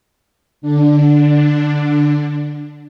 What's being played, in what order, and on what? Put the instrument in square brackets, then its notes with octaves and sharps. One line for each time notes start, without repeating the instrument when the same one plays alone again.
[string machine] D3 D4